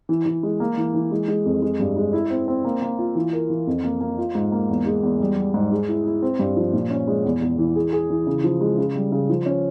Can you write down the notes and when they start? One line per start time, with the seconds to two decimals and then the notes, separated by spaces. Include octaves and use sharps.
0.09 E3
0.26 E3
0.43 G#3
0.60 A#3
0.77 E3
0.94 E3
1.11 G#3
1.28 G#3
1.45 F2
1.62 G#3
1.79 G2
1.96 G#3
2.13 E4
2.30 C4
2.48 C4
2.64 A#3
2.82 A#3
2.99 F4
3.15 E3
3.33 A#4
3.50 E3
3.67 F2
3.84 A#3
4.01 A#3
4.18 F4
4.35 G#2
4.52 A#3
4.69 E2
4.86 G#3
5.03 E2
5.20 G3
5.37 G3
5.54 G#2
5.71 G#3
5.88 E4
6.05 E4
6.22 C4
6.39 G2
6.56 F3
6.73 A#2
6.91 C#4
7.07 G#3
7.25 E2
7.42 E2
7.58 E3
7.76 G#4
7.93 G#4
8.10 E3
8.27 C#3
8.44 F3
8.61 G#3
8.78 C#3
8.95 G3
9.12 C#3
9.29 F3
9.46 C#4